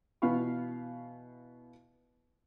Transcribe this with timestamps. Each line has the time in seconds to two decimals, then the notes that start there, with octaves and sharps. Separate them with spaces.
0.22 B2 E3 B3 F5 B5 C#6